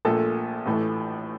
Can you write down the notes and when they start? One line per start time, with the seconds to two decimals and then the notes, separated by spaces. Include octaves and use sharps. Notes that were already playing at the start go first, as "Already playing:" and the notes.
0.05 A#1 A#2 A3 A4
0.66 A1 A2 E3 A3